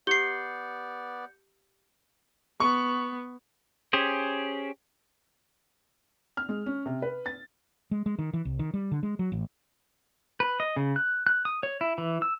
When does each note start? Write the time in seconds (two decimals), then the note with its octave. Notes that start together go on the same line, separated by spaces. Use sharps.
0.07 B3 G4 D5 G6 C7 C#7 G7
2.60 B3 C#6
3.93 C#4 G4 G#4 C5
6.37 F6
6.49 G#3
6.66 C#4
6.86 C3
7.02 B4
7.26 A6
7.91 G#3
8.06 G#3
8.19 D#3
8.34 E3
8.45 C2
8.59 D#3
8.74 G3
8.91 D3
9.03 G#3
9.19 F#3
9.32 A1
10.40 B4
10.60 D#5
10.76 C#3
10.96 F#6
11.27 F#6
11.45 D#6
11.63 C#5
11.81 E4
11.98 E3
12.22 E6